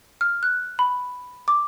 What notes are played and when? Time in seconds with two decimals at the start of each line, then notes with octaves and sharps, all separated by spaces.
0.21 F6
0.43 F#6
0.79 B5
1.48 D6